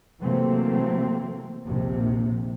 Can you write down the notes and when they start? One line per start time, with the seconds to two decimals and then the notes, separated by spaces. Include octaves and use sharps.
0.21 C3 E3 F#3 A3 A#3 C4
1.65 A#1 D#2 C3